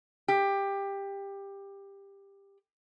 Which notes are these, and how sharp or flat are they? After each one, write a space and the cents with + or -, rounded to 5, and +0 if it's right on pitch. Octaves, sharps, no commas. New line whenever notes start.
G4 +15